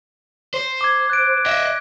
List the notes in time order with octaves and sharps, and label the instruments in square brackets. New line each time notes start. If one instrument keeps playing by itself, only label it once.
[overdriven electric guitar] C5
[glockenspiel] D6 G#6
F#6 A6 D7
[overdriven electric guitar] D#5 E5